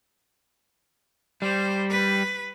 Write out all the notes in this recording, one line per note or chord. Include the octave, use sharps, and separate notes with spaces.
G3 C5
B4